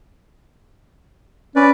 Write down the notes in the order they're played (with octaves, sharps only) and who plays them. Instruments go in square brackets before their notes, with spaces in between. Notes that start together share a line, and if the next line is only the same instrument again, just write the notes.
[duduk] C#4 [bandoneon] B4 D5